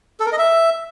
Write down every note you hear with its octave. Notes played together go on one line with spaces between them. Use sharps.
A4
A#4
D#5
E5